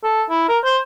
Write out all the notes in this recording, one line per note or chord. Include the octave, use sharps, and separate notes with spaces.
A4
E4
A#4
C5